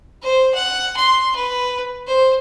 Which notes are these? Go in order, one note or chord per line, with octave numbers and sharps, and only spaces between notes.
C5
F#5
C6
B4
C5